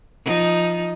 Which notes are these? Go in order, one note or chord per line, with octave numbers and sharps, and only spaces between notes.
F3 D#4